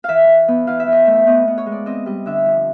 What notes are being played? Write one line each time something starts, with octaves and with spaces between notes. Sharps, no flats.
E3 E5 F5
E3
B3
E3 F5
E5
E3
D#5
A3 E5
B3 D#5
B3
C#5
G#3
D5
C4 D#5
G3 D#5
D3 E5
F3